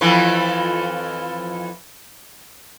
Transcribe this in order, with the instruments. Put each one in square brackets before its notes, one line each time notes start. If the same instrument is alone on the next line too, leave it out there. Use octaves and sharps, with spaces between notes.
[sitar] F2 E3 F3